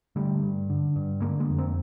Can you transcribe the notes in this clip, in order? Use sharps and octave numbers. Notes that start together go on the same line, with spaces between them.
D3 G3 A3
G2
D3
G2
D3 G#3 A#3
G#3 A#3
F2
A#3 C4